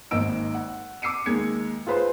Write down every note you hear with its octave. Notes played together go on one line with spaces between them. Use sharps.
G#1 D#2 D#5 E6 D7
F#5
D6 E6 C7 C#7 D#7
D#2 G#3 G#6 C#7
F4 G#4 B4 C5 C6